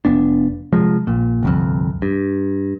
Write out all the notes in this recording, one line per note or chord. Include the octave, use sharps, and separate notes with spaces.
F1 B3 D4
C3 F3 G#3
A#1 A#2
G1 C2 F2
G2